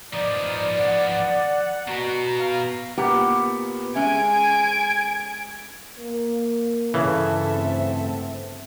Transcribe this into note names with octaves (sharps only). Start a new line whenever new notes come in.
F3 B3 D#4 D5
F#5
B2 B3 F#4 A#5
F5
A#2 B3 G4
G#3 C#4 E5 G#5 G#6 D7
A#3
G1 C#3 E3 A4 E5
A3 B3 C4